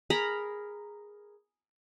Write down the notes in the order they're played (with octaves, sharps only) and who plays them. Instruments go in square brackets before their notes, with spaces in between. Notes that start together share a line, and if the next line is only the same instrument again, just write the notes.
[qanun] G#4 A#4 A#5 B5